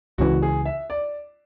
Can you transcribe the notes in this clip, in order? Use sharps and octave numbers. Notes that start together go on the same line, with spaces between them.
C#2 C#3 E3 F#4
G#4
E5
D5